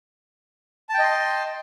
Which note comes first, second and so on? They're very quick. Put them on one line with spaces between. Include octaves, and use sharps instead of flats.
A5 G5 D#5 C6